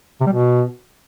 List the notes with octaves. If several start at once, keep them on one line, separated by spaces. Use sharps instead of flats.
C3
G3
B2